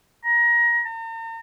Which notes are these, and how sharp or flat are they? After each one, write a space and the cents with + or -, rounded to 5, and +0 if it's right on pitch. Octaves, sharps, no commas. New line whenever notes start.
A#5 +25
A#5 -45